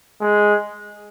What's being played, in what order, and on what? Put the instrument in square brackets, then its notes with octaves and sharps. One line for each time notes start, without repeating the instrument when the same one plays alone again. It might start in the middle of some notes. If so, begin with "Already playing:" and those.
[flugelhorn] G#3